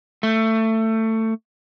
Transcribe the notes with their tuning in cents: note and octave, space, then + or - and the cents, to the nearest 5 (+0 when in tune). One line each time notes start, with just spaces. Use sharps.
A3 +20